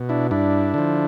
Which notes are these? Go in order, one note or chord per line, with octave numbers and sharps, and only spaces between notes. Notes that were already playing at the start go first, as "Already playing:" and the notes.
Already playing: B2
D4 E4
G2 D4 E4
D3 F3